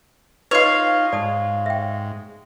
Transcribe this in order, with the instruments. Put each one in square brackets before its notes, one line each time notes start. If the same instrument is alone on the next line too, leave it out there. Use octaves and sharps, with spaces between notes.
[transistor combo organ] D#4 F4 [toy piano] B4 D#5 C6 [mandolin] C#5 F5
[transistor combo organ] G#2 [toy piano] D5 A5 D#6
[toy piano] E5 G5